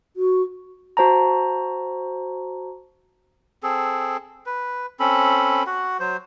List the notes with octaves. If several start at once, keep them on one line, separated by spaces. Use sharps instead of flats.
F#4
F#4 C5 A5 A#5
C4 G#4 A4
B4
C4 C#4 A4 B5
F#4 F#5
F#3 C5